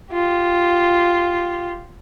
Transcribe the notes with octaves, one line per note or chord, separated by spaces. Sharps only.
F4 G4